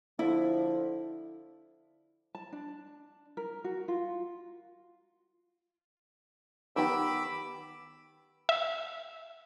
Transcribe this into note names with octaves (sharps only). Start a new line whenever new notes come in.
D3 F3 E4
A5
D4
A#4
F#4
F4
D#3 B3 G4 B5 D6 E6
E5